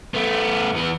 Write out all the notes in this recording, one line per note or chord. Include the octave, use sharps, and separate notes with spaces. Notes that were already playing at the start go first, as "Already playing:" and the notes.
A3 B3
E2 B3